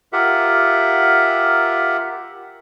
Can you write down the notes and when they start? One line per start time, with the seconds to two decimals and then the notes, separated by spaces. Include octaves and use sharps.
0.13 F4 G4 A#4 E5 F#5